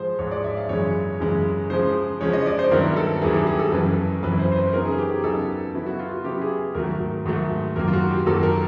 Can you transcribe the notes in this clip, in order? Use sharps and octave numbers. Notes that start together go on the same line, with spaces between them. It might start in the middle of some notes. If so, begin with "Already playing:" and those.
Already playing: G#2 F3 G#3 C5
G#2 F3 G#3 C#5
D5
E5
F5
F#2 C#3 E3 G#3 C#5
F#2 C#3 E3 G#3
C#3 F3 G#3 C5
C#3 F3 G#3 C#5
D#5
D5
C5
G2 D#3 F#3 B3 E4 A#4
A4
G2 D#3 F#3 B3 E4 G#4
G4
G#4
A4
F#2 C#3 E3 B4
F#2 C#3 E3 B4
C5
C5
B4
C#3 F#3 B3 D#4 A#4
G#4
G4
G#4
C#3 F#3 B3 D#4 A4
C#3 F#3 B3 E4
F#4
F4
F#4
C#3 F#3 B3 E4 G4
G#4
G#2 D#3 F#3 A3 A#4
G#2 D#3 F#3 A3
F#2 D#3 F#3 A#3 A#4
F4
F#4
G4
F#2 D#3 F#3 A#3 A4
A#4